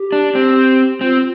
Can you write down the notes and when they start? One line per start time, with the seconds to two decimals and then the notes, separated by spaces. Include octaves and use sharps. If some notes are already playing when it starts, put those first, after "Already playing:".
Already playing: G4
0.12 D4
0.35 C4
1.01 C4 F4